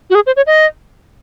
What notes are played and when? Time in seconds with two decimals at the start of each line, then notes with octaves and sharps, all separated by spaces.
0.10 F#4
0.15 G#4
0.26 C5
0.36 C#5
0.47 D#5